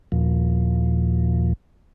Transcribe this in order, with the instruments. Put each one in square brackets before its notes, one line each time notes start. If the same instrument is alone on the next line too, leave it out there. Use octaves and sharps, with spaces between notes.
[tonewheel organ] D#2 A#2 F3